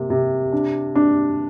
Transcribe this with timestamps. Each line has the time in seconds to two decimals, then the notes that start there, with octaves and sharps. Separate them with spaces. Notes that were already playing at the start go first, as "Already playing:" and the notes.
Already playing: C3 A#3
0.10 C3
0.52 D4
0.95 D4